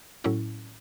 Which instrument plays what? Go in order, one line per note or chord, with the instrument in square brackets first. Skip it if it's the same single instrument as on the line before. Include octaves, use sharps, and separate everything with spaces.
[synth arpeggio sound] A2 F#3 C#4 E4